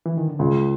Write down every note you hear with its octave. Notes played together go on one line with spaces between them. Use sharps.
E3
D#3
D3
C#2 C#3